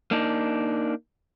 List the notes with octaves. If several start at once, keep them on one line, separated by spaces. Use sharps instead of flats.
A#3 D4 D#4